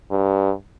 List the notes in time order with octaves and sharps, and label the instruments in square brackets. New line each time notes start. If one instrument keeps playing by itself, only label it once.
[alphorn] G2